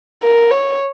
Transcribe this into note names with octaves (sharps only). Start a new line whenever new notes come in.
A#4
C#5